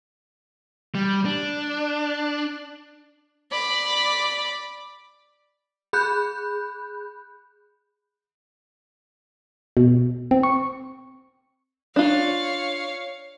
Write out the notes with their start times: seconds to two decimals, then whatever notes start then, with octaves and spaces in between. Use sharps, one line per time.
0.95 G3
1.25 D4
3.52 D5 B5
5.93 G#4 B5 F#6 G6
9.77 B2
10.31 C4
10.43 C#6
11.96 D4 F4 C#5 F5